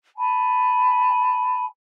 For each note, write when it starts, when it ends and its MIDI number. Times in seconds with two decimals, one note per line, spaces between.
0.17 1.64 80
0.17 1.64 81
0.17 1.64 83